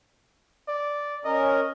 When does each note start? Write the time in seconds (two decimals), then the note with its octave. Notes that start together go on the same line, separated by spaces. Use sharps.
0.68 D5
1.25 C#4 A#4 D#5